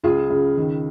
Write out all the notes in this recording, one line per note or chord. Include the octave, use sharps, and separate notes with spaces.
C#2 F4 G#4
C#3
D#3